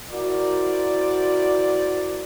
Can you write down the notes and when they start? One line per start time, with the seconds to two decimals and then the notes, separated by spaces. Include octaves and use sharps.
0.11 E4 F#4 A#4 C5 D5